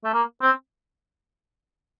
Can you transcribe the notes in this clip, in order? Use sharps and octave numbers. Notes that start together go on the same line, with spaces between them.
A3
A#3
C4